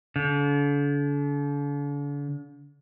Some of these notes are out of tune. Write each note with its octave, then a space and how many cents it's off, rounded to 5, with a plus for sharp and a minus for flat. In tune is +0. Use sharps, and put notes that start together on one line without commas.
D3 -40